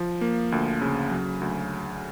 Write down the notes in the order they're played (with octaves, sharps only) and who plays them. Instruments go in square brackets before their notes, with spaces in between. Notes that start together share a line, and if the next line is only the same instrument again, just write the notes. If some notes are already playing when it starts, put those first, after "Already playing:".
Already playing: [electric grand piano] F3
A#3
D2
C#3
F#3
D2